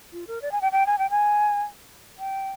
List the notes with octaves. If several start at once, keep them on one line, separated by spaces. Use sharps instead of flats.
F4
A#4
D5
G#5
G5
G5
G#5
G5
G#5
G5